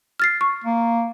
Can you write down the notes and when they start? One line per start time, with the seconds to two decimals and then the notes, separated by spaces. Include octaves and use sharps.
0.20 F6 A6 C7
0.41 C#6
0.64 A#3